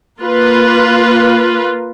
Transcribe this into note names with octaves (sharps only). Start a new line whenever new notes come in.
A#3 F4 B4